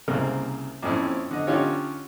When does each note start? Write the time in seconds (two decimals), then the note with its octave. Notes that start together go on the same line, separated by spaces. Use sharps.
0.08 C2 C#3 A#3 C4
0.83 F2 A#2 C4 C#4 E4
1.31 D3 D#5
1.47 D3 C#4 D#4 F4 G4 C#5